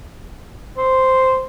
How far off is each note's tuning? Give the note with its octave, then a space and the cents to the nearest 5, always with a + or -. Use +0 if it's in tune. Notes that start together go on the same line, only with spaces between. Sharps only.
C5 -5